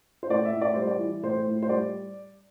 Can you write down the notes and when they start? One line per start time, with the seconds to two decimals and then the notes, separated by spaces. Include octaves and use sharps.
0.23 C5
0.29 A2 D5
0.45 E5
0.53 A2
0.61 D5
0.74 G3 C5
0.87 D5
1.00 E3
1.22 A2 C5
1.46 A2
1.63 C5
1.69 G3 D5